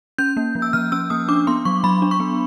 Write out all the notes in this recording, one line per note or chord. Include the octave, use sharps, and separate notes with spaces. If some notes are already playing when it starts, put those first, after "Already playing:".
C#4 G6
A#3
F3
E6
F3 F6
C#4 E6
A#3 D#6
D4 D6
B3 C6
F#3 C#6
F#3 B5
D4
C#6
B3